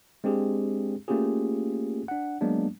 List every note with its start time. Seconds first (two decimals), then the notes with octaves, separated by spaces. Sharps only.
0.24 G#3 C4 D4 G4 G#4
1.08 A3 A#3 C#4 F4 G4 G#4
2.08 D4 F#5
2.41 F#3 G#3 A#3 B3 D4